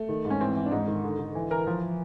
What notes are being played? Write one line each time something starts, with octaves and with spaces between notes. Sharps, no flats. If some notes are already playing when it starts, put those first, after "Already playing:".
Already playing: A3
D#3
G#2
C#4
E3 C4
E3
D4
G#2 D#4
D#3
D3
D3
E3
E3 A#4
F3